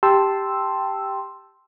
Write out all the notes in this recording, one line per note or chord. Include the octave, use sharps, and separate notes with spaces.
G4 G5 A5 C6 E6